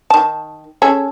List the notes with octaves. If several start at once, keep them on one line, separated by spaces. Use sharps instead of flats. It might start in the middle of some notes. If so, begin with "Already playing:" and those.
D#3 A5
C#4 G#4 A4